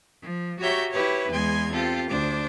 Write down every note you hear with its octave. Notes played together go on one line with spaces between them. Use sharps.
F3
F#4 G4 C#5 E5 A#5 G6
E4 G4 B4 C#5
E2 G#3 G#5 C6 G#6
C4 F4 G4 A4
D2 D4 C5 D6